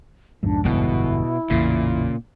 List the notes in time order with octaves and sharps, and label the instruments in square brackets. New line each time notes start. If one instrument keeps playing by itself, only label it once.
[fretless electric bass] B1 F2 G#2 [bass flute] D4
[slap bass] G1 [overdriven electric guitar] B2 [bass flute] E4
[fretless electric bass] A1 E2 [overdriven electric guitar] A#2 [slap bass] C#3